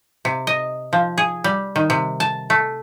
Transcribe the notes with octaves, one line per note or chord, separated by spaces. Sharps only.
C3
D#5
F3
G#4
G3
D#3
C3
A5
A3